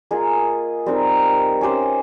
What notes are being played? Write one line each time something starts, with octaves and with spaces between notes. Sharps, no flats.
A#3 F4 G#4 D#5
G3 C4 D#4 A#4
C#4 G4 C5